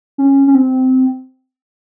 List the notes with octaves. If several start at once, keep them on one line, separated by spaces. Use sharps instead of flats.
C#4
C#4
C4